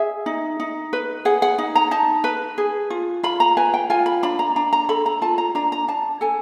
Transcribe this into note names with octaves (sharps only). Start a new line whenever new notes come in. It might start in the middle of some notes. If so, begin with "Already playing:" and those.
Already playing: G#4 E5
D#4
D#4
B4
G#4 F#5
F#5
D#4
A#5
D#4 A5
B4
G#4
F4
F4 B5
A#5
B4 G#5
G5
F4 G#5
B5
D4 B5
A#5
D4 A#5
A#5
A4 B5
A#5
F4 A5
A#5
D4 A#5
A#5
D4 A5
A4 G#5